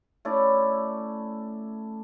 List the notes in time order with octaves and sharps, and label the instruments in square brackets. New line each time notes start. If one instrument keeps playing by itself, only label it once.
[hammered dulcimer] A3 C#4 E4 D5